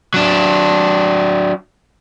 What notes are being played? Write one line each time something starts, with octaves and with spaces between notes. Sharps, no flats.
F#3 D4